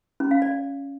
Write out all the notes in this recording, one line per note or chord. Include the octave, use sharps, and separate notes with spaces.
C#4
F5
D5